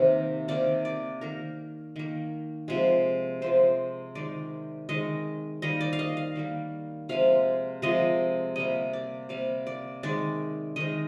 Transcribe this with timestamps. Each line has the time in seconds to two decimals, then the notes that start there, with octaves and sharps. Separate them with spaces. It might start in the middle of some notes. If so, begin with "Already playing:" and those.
Already playing: C3 D#3 A#3 A#4
0.48 C3 D#3 A#3 D5
0.85 D5
1.21 D#3 A#3 A#4
1.96 D#3 A#3
2.68 C3 F3 G#3
3.42 C3 F3 G#3 C5
4.15 D#3 G#3 D5
4.89 D#3 G#3 D#5
5.62 D#3 G3 A#3 D#5
5.81 D5
5.93 F5
5.99 D#5
6.17 F5
6.36 D#3 G3 A#3
7.09 C3 F3 G#3 F5
7.82 C3 F3 G#3 D#5
8.56 C3 G3 A#3 D#5
8.93 D5
9.29 C3 G3 A#3 F5
9.67 D5
10.03 D#3 G#3 D5
10.76 D#3 G#3 D#5